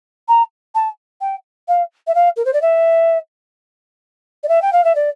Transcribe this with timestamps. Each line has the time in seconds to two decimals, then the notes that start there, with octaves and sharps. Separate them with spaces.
0.28 A#5
0.75 A5
1.21 G5
1.68 F5
2.07 E5
2.15 F5
2.37 A#4
2.45 C5
2.53 D5
2.62 E5
4.44 D5
4.49 E5
4.62 G5
4.73 F5
4.84 E5
4.95 D5